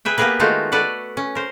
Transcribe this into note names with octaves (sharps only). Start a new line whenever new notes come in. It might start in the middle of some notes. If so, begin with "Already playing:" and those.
G#4 B4 E5 G5
A#3 B3 G4 G#4 A#4 B4
D#3 G#3 A3 D#4 F4 F#4
A4 B4 D5 F#5
C#4
A#4 C5